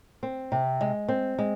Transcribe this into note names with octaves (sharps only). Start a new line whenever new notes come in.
C4
C3
G#3
C4
G#3